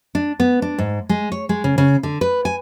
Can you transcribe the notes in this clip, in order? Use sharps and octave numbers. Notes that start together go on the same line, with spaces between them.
D4
B3
D4
G#2
G#3
C#5
G#3
C#3
C#3
D3
B4
G#5